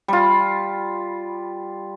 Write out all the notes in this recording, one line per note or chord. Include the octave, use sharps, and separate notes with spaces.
G3 F4